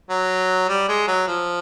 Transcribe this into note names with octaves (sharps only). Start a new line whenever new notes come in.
F#3
G3
G#3
F#3
F3